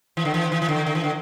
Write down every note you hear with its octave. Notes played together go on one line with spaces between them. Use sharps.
E3
D3
E3
E3
E3
D3
D3
E3
D3